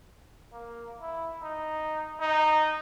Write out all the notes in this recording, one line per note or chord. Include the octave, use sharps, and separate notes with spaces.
A#3
E4
D#4
D#4